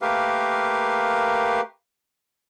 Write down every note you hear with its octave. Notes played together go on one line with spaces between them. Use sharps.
A3 A#3 G4 A#4 B4 F5